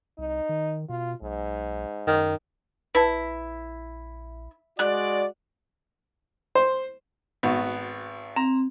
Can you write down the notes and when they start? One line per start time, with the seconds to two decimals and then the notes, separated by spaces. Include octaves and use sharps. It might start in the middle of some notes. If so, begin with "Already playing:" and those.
0.18 C2 D#4
0.49 D#3
0.89 B2 F4
1.22 B1 G#2
2.07 F#2 D#3
2.95 A#1 E4 B4 A5
4.79 G#3 F#4 D5 F#6
6.55 C5
7.43 G#1 B3 F#4
8.36 C4 A#5